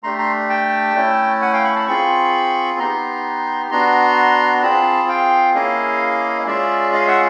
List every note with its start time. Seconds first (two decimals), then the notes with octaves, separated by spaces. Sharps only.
0.03 A3 D4 G4 A#5 C6
0.18 A#5 C6
0.50 G5 A5
0.95 A3 C#4 E4
1.41 F#5 G#5
1.53 F5 G5
1.64 B5 C#6
1.75 A5 B5
1.87 C4 F4 G#4 B5 C#6
2.79 B3 D#4 G4 A#5 C6
3.71 B3 D4 F#4 A#5 C6
4.63 C4 F4 G#4 A5 B5
5.09 F5 G5
5.54 A#3 C#4 E4 G#4 D#5 F5
6.46 G#3 C#4 F4 G#4 D5 E5
6.93 D#5 F5
7.07 E5 F#5